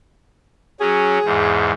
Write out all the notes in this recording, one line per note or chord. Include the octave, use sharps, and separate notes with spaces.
F#3 C#4 G#4
E2 G#2